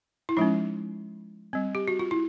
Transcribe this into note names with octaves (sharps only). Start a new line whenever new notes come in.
E4
F3 G#3 C#4 D#4
G3 C4
G4
F#4
F4
E4